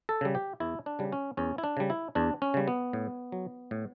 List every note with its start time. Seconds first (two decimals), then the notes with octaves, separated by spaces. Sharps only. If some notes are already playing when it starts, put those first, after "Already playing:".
0.09 A4
0.21 C#3 G3
0.35 G4
0.60 E2 E4
0.86 D4
0.99 C#3 G3
1.12 C#4
1.37 E2 C#4
1.58 E4
1.64 D4
1.77 C#3 G3
1.90 E4
2.15 E2 D4
2.42 C#4
2.54 C#3 G3
2.68 B3
2.93 A2
3.32 F#3
3.71 A2